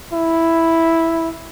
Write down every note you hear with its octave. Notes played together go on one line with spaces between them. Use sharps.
E4